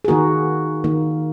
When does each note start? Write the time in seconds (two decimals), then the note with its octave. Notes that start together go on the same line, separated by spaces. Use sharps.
0.05 G#4
0.08 D#3 A#3 F#4 A#4
0.84 D#3 A#3